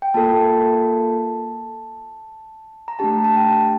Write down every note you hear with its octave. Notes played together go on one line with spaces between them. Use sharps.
G5
A#3 F4 A4 A5
A#5
A3 D4 G4 A5
A5
G5